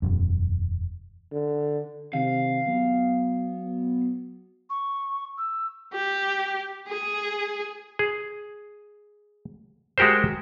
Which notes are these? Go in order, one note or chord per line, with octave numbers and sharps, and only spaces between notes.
E1 F#2
D3
C3 D#3 F5
F#3 B3
C#6
E6
G4
G#4
G#4
G#3 F#4 G4 A#4 C5